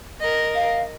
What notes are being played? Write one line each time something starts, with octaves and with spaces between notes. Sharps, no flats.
A#4 D#5
F5